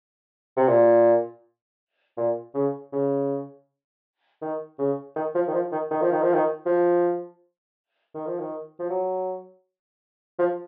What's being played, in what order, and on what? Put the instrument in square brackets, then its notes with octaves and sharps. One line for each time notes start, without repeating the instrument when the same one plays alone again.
[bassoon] C3
A#2
A#2
C#3
C#3
D#3
C#3
D#3
F3
D#3
F3
D#3
D#3
F3
D#3
F3
D#3
F3
D#3
F3
D#3
F3
F#3
F3